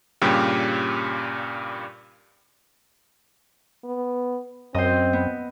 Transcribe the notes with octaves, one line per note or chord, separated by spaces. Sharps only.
G2 A#2 C#3 G4
B3
F#2 C4 C5 D#5
B3